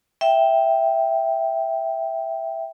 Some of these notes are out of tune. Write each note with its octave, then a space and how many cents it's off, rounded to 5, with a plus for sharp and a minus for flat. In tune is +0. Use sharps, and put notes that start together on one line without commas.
E5 +0 G5 +0